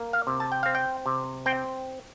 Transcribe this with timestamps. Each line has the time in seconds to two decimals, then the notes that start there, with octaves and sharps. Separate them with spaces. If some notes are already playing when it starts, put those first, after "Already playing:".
Already playing: A#3
0.13 F5
0.27 C3
0.40 A5
0.52 G5
0.63 C4 F5
0.75 G5
1.06 C3
1.46 C4 G5